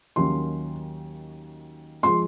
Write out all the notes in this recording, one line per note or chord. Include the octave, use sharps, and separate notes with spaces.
D#2 D#3 F#3 A#3 C#4 C6
F3 G#3 C6